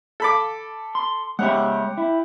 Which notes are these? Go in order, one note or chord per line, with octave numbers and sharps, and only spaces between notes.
A4 B5 D6
C6
G#3 G4 C#5 E5 F#5
E4